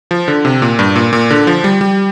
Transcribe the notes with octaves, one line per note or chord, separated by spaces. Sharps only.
F3
D3
C3
A#2
G2
A#2
A#2
D3
F3
G3
G3